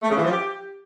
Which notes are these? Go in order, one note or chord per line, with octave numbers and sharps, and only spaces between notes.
A3
C#3
E3
F3
G4